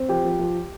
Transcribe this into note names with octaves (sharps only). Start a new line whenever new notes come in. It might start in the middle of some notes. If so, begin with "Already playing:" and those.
Already playing: C4
F3 G4 G5
F3
F3